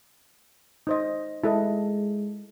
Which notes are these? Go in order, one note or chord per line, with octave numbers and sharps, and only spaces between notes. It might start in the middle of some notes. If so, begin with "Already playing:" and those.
D#4 C5 D#5
G#3 E4 A4 D#5